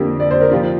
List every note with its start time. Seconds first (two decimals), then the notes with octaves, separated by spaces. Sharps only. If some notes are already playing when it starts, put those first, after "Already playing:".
Already playing: F2 D3 A#3 G4
0.20 D5
0.31 C5
0.41 A#4
0.51 F3 A#3 F4 G4